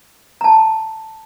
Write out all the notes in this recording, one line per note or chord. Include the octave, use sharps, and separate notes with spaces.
A5 A#5